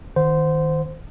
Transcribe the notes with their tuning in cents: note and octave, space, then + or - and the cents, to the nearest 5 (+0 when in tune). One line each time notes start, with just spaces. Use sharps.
D#3 +0 C5 -15 F#5 -15